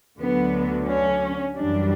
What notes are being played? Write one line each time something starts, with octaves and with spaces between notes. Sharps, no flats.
D2 D3 F#3 B3
C#4
F#2 E3 G3 D4